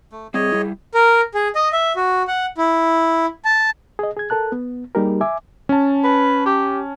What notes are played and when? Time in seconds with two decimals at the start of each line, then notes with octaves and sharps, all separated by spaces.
0.12 A3
0.34 G3 C4 G#4 C#5 D#5
0.52 G3 E4
0.94 A#4
1.34 G#4
1.55 D#5
1.73 E5
1.96 F#4
2.28 F#5
2.58 E4
3.45 A5
3.99 G#4 D#5
4.17 G#4 G#6
4.30 A4 A#4 A5 F#6
4.52 B3
4.95 G3 A#3 D#4 G4 G#4 A#4
5.21 E5 G#5 D6
5.69 C#4 A5
6.04 B4
6.46 G4